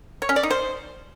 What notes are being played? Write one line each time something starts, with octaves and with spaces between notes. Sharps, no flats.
C#5
C#4
D5
D#4
C5